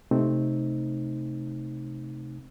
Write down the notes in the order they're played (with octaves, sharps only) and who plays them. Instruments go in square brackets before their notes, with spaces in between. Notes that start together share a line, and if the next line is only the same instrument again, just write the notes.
[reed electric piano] C3 A3 C4 D#4